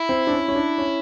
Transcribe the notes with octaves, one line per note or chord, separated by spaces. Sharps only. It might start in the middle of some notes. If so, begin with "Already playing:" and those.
Already playing: E4
C4
D4
C#4
C#4
D4
C#4